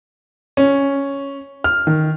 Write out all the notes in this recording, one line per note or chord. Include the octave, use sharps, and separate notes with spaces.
C#4
F6
D#3